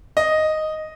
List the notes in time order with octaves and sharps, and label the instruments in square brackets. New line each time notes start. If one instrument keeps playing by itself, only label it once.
[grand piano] D#5